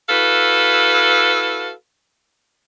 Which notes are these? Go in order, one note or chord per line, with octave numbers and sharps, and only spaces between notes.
E4 F#4 A4 B4 F5